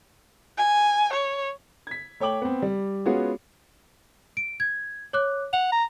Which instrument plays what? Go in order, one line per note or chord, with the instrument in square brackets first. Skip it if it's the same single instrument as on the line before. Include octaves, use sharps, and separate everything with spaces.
[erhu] G#5
C#5
[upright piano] G#6 B6
A3 C#5 G5 D6 F#7
B3 C4
G3
G#3 B3 C#4 F4 F#4 G#4
[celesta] D7
G#6
C#5 D6 F#6
[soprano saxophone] F#5 [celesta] F7
[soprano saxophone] A#5